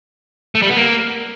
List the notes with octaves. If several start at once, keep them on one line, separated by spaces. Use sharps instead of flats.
A3
G3
B3
A#3